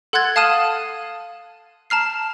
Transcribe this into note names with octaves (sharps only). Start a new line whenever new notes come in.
A4 F#5 C6 F#6 G#6 A6
F5 A5 D#6 F6 D#7 E7
A5 A#5 F6 C7